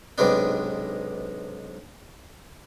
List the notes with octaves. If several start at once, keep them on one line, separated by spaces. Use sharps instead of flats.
B1 G#2 C3 B3 D4